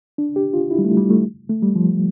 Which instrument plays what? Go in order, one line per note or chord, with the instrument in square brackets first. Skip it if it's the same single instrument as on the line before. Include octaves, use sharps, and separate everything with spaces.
[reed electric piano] D4
G4
F4
E4
G3
A3
G3
A3
A3
G3
F3